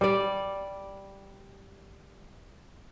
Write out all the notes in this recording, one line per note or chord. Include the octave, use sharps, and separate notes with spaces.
G3 D5